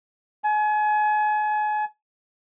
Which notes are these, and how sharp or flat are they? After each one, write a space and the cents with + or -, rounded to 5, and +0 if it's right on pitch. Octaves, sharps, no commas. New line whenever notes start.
G#5 +35